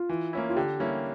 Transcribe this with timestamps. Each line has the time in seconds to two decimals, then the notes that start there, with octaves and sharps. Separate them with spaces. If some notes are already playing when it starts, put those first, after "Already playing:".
Already playing: F4
0.09 E3
0.33 A#3 C#4 E4
0.50 F4
0.56 D3 G4
0.80 G3 A#3 C#4 E4